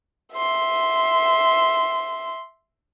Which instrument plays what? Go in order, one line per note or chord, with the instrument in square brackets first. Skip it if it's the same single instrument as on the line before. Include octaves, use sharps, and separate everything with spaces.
[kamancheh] E5 C6